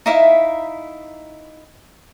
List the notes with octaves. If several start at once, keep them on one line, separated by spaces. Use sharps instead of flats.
D#4 E4 E5 F5